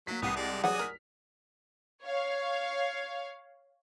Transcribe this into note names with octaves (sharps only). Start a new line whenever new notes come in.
F#3 A#3 B6
C2 B3 F#5 D#6 C7
G#3 D5
E3 F#3 F#4 G#4 D5 F#5 G#5 D#6
A#4 F6 B6
C#5 F5